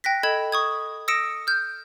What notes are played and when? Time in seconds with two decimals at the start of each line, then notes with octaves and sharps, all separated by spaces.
0.04 G5 F#6 A#6 B6
0.23 A4 D#5 B5 G#6 E7
0.52 C#6 D#6 G#6
1.08 D#6 E6 A#6 C#7 D7 E7
1.47 F6 G6